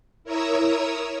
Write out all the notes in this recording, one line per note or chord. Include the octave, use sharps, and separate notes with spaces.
E4 A#4 C#5 A#5 D#6 E6